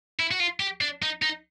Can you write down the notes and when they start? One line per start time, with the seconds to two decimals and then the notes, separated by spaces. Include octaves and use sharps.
0.20 E4
0.31 F#4
0.40 F4
0.60 G4
0.81 D4
1.02 D#4
1.22 D#4